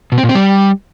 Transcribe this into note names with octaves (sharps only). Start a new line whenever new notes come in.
B2
C4
A#2
C4
G3